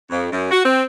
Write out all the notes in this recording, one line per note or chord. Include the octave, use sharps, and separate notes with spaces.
F2
F#2
F#4
C4